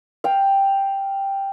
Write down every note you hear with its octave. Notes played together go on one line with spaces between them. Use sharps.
F5 G5